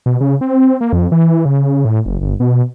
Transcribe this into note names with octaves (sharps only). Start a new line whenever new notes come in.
B2
C#3
C4
A#3
F2
E3
C#3
A2
F#1
G1
B2